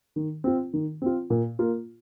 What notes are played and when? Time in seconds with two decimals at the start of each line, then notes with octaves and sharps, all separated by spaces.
0.16 D#3
0.44 C4 F4
0.73 D#3
1.02 C4 F4
1.30 A#2
1.59 A#3 F4